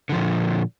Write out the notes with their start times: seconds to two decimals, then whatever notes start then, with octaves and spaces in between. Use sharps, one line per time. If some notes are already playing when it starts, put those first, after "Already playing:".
0.09 D3
0.12 F3
0.15 A#2